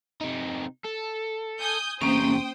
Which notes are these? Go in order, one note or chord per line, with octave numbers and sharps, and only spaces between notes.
C3 D#4
A4
G#5 D#6 G6
E2 C3 A#3 C#4 C5 G5 D#6